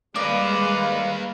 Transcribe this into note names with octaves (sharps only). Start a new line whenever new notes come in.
G3 G#3 A#3 B4 D5 D#5 F5